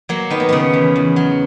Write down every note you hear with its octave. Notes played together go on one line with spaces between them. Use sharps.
F#3 A#3
D#3 B3
A#3
C#3 B3
E2
E2
F#3